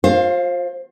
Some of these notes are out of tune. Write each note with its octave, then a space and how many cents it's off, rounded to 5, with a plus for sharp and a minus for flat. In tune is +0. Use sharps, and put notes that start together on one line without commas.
F4 +35 C5 +25 F5 +0